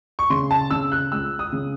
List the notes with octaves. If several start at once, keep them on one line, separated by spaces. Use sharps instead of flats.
C#6
C#3 C6
A5
C#3 E6
F#6
C#2 E6
D#6
C#3